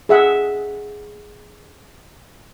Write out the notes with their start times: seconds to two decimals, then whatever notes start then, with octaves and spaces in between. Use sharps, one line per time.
0.09 G#4 E5 F#5